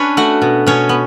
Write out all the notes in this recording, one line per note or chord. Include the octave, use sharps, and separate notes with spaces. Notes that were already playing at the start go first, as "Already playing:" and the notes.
Already playing: C#4 D4 B4 C#5
A3 F#4 F#5
B2
B2 C#4 C#5
B3